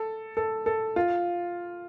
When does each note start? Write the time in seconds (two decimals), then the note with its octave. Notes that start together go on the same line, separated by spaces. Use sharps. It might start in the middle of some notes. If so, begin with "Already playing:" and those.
Already playing: A4
0.37 A4
0.66 A4
0.96 F4